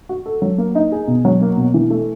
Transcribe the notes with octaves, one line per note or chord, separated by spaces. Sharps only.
F#4
A4
F#3
A#3
D#4
G#4
B2
F#3
A#3
B2
E3
A3